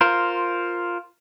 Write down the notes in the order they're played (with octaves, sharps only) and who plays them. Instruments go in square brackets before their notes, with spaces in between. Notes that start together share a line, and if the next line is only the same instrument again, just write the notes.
[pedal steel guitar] F4 A#4 C5